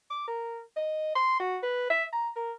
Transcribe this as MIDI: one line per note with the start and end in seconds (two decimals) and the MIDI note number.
0.10 0.26 86
0.28 0.60 70
0.77 1.13 75
1.15 1.38 84
1.40 1.58 66
1.63 1.86 71
1.90 2.04 76
2.13 2.29 82
2.36 2.52 70